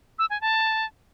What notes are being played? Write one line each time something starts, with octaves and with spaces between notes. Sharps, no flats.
E6
G#5
A5